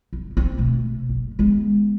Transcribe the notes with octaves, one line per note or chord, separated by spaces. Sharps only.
G1
C4
B2 A3
F#1
G#3 B3